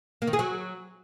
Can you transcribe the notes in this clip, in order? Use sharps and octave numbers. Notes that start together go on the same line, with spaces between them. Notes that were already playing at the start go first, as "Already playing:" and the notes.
A#3
D#3
G#4
F#3